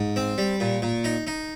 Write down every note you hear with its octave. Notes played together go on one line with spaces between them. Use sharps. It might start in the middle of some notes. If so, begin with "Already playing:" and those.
Already playing: G#2
C4
G3
A#2
A#2
D#4
D#4